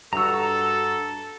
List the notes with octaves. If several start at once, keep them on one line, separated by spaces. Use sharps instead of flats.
G2 F#4 A4 A#5 E6